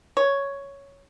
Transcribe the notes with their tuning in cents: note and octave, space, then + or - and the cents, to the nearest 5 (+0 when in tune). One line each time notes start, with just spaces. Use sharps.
C#5 +5